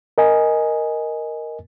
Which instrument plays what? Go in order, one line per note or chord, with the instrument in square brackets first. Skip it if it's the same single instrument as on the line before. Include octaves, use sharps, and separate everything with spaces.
[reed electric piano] A#4 D#5 G#5